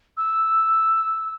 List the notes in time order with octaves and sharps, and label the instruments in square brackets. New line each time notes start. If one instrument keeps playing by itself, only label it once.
[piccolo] E6